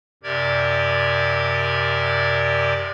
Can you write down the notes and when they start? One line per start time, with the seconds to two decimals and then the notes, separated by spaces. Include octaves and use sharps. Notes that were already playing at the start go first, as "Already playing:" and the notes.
0.23 F#2 C3 G4 A#4 D5 G#6